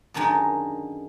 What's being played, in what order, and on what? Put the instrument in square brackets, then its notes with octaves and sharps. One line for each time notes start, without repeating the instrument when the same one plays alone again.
[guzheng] F#2 D3 D#3 G#3 D#4